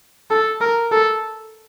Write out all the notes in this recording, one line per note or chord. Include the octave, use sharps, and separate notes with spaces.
A4
A#4
A4